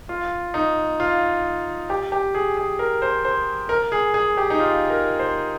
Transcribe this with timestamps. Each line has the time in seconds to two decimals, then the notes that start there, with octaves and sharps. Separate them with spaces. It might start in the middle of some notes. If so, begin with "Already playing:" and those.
0.09 F4
0.54 D#4
1.00 F4
1.90 G4
2.12 G4
2.35 G#4
2.57 G#4
2.79 A#4
3.02 C5
3.25 C5
3.69 A#4
3.92 G#4
4.14 G#4
4.37 G4
4.50 D#4
4.60 F4
4.90 A#4
5.19 C5